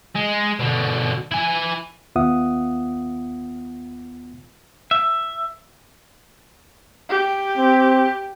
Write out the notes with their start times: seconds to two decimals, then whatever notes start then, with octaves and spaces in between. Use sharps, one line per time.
0.16 G#3
0.60 B2 D3
1.32 E4 G#5
2.16 D#2 B3 F4 E5 F#5 D#6
4.91 E5
7.09 G4
7.58 C4